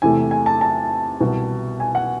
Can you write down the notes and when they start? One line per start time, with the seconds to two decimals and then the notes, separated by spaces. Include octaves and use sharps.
0.02 E2 C3 E3 A3 G#5
0.31 G#5
0.46 A5
0.61 A5
1.21 C2 B2 G3 B3
1.80 G#5
1.95 F#5